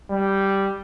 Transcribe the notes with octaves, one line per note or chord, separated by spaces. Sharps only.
G3